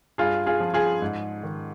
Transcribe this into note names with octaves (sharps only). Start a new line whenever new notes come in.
G2 F4 G#4
F4 G#4
F3
F4 G#4
G#2
D#3